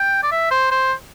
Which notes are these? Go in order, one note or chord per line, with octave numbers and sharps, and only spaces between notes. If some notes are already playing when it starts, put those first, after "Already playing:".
Already playing: G5
D5
E5
C5
C5